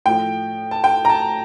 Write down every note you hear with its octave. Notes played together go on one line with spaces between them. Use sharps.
A2 F3 G5
A5
G5
A#5
A5